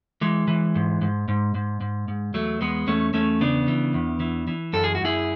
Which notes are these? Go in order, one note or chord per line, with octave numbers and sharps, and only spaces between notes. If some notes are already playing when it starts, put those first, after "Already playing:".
E3 G#3
E3
G#2
G#2
G#2
G#2
G#2
G#2
E2 F#3 A3
E2 G#3 B3
E2 A3 C#4
E2 A3 C#4
C#3 B3 D4
E3
E2
E3
E3
F#2 A4
G#4
F#4
F#2 E4 G#4